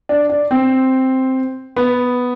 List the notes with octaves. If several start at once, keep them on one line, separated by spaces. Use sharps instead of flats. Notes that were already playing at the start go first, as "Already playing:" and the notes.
D4
D4
C4
B3